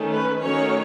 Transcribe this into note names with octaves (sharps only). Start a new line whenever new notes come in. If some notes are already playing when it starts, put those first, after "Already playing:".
Already playing: D#3 A3 C#4
B4
D#3 F#3 A3 C#4 C#5